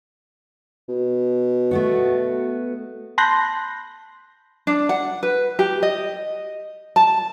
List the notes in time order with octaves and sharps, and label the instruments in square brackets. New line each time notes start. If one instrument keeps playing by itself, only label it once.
[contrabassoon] B2
[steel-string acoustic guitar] A3 B3 F#4
[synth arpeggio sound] A5 B5 C6 F#6 G6 A#6
[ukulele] D4
F#5
B4
G4
D#5
A5